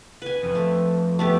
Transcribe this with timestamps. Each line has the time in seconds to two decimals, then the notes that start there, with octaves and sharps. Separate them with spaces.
0.22 B4 G#5
0.43 F2
0.55 A3
1.19 A3 B3 G4